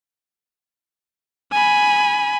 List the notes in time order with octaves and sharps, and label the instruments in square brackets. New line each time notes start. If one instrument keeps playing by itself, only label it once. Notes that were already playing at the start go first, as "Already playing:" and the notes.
[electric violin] G#5 B5